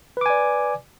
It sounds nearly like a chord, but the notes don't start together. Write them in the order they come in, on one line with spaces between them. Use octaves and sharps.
B4 D6 G#5 D5